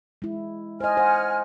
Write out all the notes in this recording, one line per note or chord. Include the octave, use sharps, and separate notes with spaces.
G#3 E4
C5 D#5 G#5 F6
C5 F#5